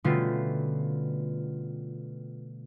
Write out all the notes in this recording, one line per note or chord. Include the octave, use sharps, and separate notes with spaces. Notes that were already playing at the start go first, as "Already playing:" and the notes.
B2 D3 G3 A3 C#4 F4